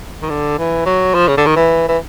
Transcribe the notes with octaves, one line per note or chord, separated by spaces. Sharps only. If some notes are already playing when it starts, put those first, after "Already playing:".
D#3
D3
E3
F#3
F3
C#3
D3
D#3
E3
E3